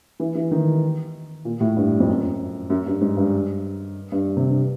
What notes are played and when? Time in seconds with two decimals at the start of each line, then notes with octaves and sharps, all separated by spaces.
0.20 E3
0.35 E3
0.51 D#3
1.45 A#2
1.60 A2
1.76 G2
2.00 F2
2.08 F#2
2.70 F#2
2.86 G2
3.01 G#2
3.17 G2
4.12 G2
4.37 C3
4.47 G2